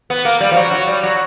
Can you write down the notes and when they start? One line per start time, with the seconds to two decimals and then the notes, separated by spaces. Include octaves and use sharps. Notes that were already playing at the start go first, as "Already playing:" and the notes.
0.10 B3
0.25 A#3
0.41 G3
0.52 F3
0.56 F#3
0.71 F#3
0.87 G3
1.03 F#3